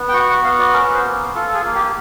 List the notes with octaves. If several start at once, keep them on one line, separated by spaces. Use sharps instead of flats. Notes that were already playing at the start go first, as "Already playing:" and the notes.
Already playing: B3
G5
F#4 F#5
F#5
B3 F5
D5
C#4 A#4
C5
A#3
F4 A4
A4
G#4
A#3
G4